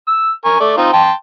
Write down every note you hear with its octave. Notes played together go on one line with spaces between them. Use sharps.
E6
A#4 G#5 C#6
A3 D5
C4 D#4 F4
G5 A5 C6